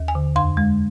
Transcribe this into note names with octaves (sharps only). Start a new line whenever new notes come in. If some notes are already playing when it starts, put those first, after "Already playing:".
Already playing: D#2
G#5
D3
F2 C6
G#3